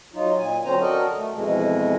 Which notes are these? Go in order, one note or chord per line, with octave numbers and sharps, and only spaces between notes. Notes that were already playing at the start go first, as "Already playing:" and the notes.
F#3 D#4 F4
A#2 G#5
D3 F#3 C4 C#4 C5 A#5
F#4 A4 A#4 D5 D#5
A3
F2 B2 E3 G#3